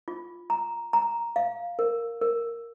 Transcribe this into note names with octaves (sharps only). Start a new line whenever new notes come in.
F4
A#5
A#5
F5
A#4
A#4